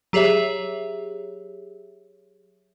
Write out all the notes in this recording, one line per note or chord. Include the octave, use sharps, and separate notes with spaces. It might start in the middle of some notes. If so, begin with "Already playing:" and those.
F#3 G4 G#4 C#5 E5